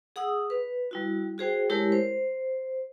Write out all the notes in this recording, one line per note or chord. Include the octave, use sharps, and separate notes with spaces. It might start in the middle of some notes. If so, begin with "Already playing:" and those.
G#4 F#5 D#6 E6
B4
G3 E4 F#4
F#4 G#4 C5 G5
G#3 A3 E4 G4 A#4 C#5
C5